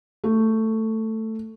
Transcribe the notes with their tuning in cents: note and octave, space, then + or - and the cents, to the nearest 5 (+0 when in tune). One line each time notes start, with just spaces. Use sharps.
A3 +10